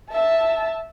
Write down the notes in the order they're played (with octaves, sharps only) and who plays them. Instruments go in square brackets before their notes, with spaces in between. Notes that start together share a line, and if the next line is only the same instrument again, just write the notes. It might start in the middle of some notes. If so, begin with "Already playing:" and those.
[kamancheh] E5 A5